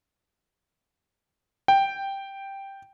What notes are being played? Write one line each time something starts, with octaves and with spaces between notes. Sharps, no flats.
G5